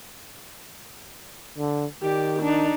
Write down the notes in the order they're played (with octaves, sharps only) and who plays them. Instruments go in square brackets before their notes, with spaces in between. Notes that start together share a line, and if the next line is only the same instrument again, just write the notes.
[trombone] D3
[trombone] D#3 [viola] G4 D5
[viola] D4 D#4